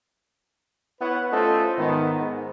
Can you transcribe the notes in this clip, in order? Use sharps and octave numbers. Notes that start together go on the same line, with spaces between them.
B3 E4 B4 C#5 F#5
A3 C#4 F4 A4 C5 D#5
G#2 D#3 B3
G#2